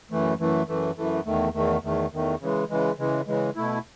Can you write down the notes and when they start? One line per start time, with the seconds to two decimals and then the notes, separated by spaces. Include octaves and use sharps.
0.11 F#2 E3 A3
0.40 F#2 E3 A3
0.68 F#2 E3 A3
0.97 F#2 E3 A3
1.26 E2 D#3 A3
1.54 E2 D#3 A3
1.83 E2 D#3 A3
2.12 E2 D#3 A3
2.41 C#3 E3 G#3
2.70 C#3 E3 G#3
2.99 C#3 E3 G#3
3.27 C#3 E3 G#3
3.56 B2 A3 E4